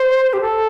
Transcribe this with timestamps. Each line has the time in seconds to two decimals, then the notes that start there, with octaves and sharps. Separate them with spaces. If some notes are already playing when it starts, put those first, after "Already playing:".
Already playing: C5
0.33 G4
0.41 A4